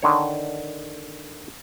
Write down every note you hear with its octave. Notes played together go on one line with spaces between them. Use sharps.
D3 D#3 C#5